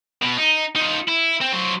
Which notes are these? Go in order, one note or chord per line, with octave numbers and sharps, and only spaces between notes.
B2 B3
D#4
D#4 F4
E4
C4
F#3 C5